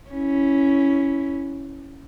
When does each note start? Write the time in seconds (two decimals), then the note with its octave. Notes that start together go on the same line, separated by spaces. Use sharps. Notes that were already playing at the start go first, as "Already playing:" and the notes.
0.10 C#4 E4